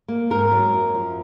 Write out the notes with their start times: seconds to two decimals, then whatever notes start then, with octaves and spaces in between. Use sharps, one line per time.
0.08 A#3
0.30 G#2 A#4
0.52 F#3
0.74 F#2
0.95 F3